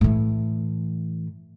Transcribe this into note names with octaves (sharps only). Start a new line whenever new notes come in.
A2 E3